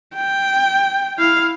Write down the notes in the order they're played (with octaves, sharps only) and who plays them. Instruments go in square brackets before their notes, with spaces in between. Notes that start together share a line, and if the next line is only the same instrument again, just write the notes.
[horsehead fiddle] G5
E4 F5